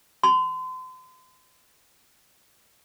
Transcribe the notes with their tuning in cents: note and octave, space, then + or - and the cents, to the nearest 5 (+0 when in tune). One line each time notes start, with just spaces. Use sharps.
C6 -40